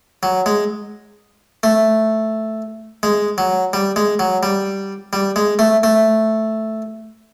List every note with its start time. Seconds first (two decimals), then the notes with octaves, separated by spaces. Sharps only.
0.23 F#3
0.46 G#3
1.63 A3
3.03 G#3
3.38 F#3
3.73 G3
3.96 G#3
4.19 F#3
4.43 G3
5.13 G3
5.36 G#3
5.59 A3
5.83 A3